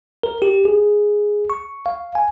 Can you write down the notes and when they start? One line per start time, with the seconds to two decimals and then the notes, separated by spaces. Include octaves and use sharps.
0.23 A#4
0.42 G4
0.65 G#4
1.50 C#6
1.86 F5
2.15 G#5